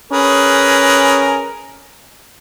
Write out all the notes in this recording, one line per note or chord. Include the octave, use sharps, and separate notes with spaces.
C#4 G#4 A#4 B4